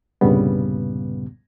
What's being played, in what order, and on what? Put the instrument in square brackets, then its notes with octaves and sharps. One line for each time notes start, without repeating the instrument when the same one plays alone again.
[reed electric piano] C2 G2 A#2 C#3 G3 B3